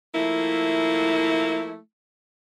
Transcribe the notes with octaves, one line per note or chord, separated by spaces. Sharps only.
F3 A3 A#3 E4